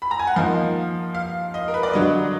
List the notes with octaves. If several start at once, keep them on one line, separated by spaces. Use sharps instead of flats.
B5
A#5
G#5
F#5
F3 A#3 D#4 F5
F5
D#5
A#4
B4
D5
D3 F#3 D4 D#5